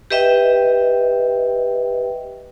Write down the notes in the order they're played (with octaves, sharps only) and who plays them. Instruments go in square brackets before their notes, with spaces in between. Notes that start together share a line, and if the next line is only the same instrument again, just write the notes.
[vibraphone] G4 B4 D#5 E5 G5